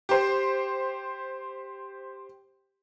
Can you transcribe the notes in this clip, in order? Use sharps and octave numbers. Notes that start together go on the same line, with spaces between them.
G4 C5